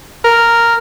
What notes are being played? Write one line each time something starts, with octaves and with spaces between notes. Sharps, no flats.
A#4